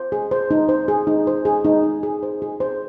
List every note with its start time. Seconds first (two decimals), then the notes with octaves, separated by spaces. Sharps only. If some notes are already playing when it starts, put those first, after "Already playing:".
Already playing: C5
0.12 G#4
0.31 C5
0.51 D#4
0.69 C5
0.88 G#4
1.07 D#4
1.27 C5
1.45 G#4
1.65 D#4
1.84 G#4
2.03 G#4
2.23 C5
2.42 G#4
2.60 C5